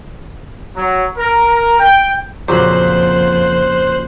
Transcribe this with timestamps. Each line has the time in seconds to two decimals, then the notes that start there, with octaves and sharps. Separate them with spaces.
0.76 F#3
1.17 A#4
1.80 G5
2.48 F2 A#2 C#3 F#3 C5 F#6